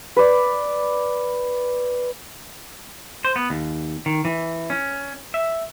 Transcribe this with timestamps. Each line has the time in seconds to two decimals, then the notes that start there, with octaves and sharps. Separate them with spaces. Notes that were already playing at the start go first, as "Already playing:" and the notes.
0.17 B4 D5
3.25 C5
3.36 B3
3.50 D#2
4.06 D#3
4.25 E3
4.70 C#4
5.34 E5